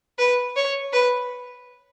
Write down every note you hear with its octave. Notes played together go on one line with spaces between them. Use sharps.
B4
C#5
B4